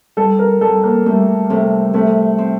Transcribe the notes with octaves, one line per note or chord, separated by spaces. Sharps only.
G3 A4
A#4
G3 A4
A#3
G3 A3
C3 A3
C3 A3
C4